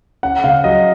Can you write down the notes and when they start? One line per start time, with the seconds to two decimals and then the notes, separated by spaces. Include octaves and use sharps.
0.23 C#4 F#5
0.44 C#3 F5
0.64 F#3 D#5